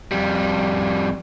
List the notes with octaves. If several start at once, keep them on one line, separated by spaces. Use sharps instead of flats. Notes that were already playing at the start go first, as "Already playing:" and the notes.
F2 G3